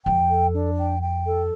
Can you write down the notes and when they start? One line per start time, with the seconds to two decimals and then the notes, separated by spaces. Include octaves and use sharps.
0.06 F2 G5
0.30 A4
0.54 D4
0.77 G5
1.01 G5
1.25 A4